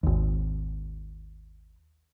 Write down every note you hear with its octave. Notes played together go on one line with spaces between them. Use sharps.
G#1 D#2